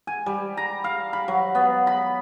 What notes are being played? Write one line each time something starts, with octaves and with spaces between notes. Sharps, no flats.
G#5
G3
A#5
F5
B5
F#3
B3
B5